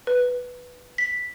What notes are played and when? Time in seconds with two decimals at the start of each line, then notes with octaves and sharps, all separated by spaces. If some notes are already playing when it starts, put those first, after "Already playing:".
0.07 B4
0.98 B6